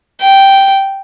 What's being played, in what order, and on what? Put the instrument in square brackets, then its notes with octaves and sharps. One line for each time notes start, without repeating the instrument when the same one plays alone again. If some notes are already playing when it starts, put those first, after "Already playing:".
[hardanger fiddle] G5